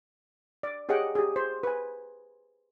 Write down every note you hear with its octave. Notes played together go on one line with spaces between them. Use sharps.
D5
G4 G#4 C#5 D#5 F#5 G5
G4 G#4
C5
B4 G#5